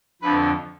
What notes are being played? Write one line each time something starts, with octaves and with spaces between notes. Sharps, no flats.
F2 D3 F3 B4